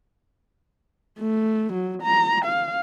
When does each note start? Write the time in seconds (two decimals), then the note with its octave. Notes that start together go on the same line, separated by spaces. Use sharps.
1.20 A3
1.73 F#3
2.02 A#5
2.45 F5